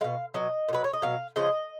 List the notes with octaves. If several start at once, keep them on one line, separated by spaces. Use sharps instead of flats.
B2 G#3 F5
B2 F#3 D#5
A#2
F#3 B4
C#5
D#5
B2 F#3 F5
C#3 F3 G#3 D#5